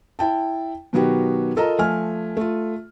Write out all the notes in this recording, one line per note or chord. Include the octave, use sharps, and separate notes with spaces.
E4 G5 A5
B2 D#3 F#3 B3 F#4 G4
F4 A4 A#4 D#5 A#5
F3 A3 G#5 F6
A3 F4